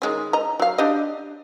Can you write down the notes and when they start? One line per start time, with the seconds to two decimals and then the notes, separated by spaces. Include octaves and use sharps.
0.02 D#3 G#3 C#4
0.33 D#5 A#5
0.60 F#3 F5
0.78 D4 G4 D#5